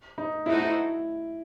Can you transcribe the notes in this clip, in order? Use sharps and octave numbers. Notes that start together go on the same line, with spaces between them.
D#4
A3 D#4 E4 F#4 A4 C5
E4